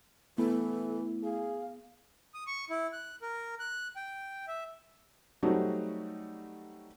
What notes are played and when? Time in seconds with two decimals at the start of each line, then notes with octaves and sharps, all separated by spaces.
0.38 E3 A3 B3 E4 A4
1.24 G#4 F5
2.34 D#6
2.47 C#6
2.70 E4
2.93 F#6
3.22 A#4
3.60 F#6
3.96 G5
4.48 E5
5.43 F#3 G3 A3 C4 D#4 F#4